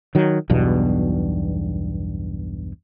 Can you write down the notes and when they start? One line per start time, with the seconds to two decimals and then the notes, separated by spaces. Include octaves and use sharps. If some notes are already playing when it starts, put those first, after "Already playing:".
0.15 D#3 F#3
0.50 B1 E2 G2 B2